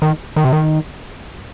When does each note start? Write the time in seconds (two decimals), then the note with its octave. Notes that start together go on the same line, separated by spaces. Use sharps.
0.02 D#3
0.36 D#3
0.44 C3
0.52 D#3